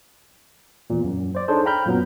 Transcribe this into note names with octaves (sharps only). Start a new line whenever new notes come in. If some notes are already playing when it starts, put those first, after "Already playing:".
E2 A#2
F#2
C5 D5
D4 D#4 G#4 A4 C5 C#5
F5 G5 A#5 B5 F6 G6
F#2 A#2 F#3 B3